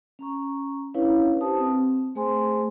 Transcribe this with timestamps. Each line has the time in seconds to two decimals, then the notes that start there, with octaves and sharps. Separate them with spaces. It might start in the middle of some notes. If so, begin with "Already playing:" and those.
0.19 C#4 A#5 C#6
0.94 C#4 D4 E4 B4 C#5 F5
1.41 G4 C5 A5 D#6
1.58 C4
2.15 A3 G#4 C5 G#5 C6